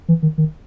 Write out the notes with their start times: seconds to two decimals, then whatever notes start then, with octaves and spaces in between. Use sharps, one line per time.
0.08 E3
0.23 D#3
0.38 D#3